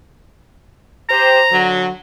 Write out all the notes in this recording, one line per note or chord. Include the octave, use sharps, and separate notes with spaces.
G4 C5 A#5
D3 F#3